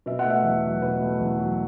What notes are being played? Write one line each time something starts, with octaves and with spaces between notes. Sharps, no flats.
B2 E5
F#5
A3
E5
E2
F#3
B2 B4
A3
E2
F#3